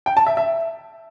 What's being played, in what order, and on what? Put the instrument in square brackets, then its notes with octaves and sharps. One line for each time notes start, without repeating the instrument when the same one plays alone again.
[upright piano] G5
A5
E5
E5